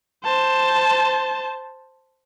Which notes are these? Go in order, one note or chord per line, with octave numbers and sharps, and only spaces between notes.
C5 A5